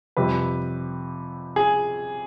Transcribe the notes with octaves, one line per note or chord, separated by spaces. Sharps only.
F2 C3 G3 B4
G#4